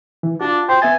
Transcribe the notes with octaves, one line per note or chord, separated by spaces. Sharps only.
E3
D4 F4 F#4
C5 G5
B3 E5 G#5 A6